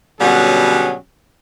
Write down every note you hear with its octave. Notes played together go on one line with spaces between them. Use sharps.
B2 D3 F#3 G3 C#4 G#4